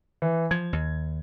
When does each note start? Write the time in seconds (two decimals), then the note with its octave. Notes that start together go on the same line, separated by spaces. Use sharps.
0.22 E3
0.51 F3 G#6
0.73 D#2